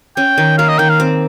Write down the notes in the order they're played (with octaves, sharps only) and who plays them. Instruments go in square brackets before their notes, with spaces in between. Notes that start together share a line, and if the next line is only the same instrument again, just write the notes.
[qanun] C#4 [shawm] G5
[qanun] D#3
[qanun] A#3 [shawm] F5
[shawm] D#5
[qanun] D#3 [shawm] G5
[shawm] F5
[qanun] C4